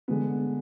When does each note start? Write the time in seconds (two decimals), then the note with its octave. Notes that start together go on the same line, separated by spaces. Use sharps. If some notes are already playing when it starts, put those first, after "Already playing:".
0.08 D3 G#3 B3